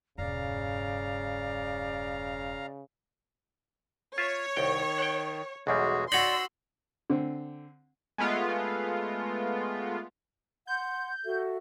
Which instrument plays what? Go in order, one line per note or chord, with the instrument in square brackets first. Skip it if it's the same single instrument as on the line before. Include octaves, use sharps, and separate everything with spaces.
[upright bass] E1 G2 [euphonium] C#3 [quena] D5 [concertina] F5 A#5
[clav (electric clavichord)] F4 E5 [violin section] C#5
[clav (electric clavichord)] C2 G5 [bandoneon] D#3
[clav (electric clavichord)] F#5 G5
[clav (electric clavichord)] B1 E2 G3 [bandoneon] G#3 F#4 G#4
[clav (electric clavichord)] D#4 C#5 [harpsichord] F#4 B5 [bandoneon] D5 [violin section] C6 E6
[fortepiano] D3 C4
[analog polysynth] G#3 A3 B3 F4
[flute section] F#5 C6 [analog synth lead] G6
[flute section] F#4 A4 E5